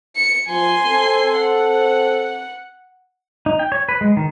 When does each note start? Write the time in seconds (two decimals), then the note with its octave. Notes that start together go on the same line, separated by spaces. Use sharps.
0.16 C#7
0.48 F3 G#5 C6
0.86 C4 A4
1.37 F#5
3.46 D#4
3.59 G5
3.72 C#5
3.89 B4
4.01 G#3
4.17 D#3